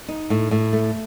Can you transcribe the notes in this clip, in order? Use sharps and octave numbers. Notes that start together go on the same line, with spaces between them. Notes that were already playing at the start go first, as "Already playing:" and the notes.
D#4
A2
A2
A3